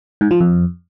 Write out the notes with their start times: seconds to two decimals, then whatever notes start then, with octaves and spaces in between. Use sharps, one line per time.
0.21 G#2
0.31 F3
0.41 F2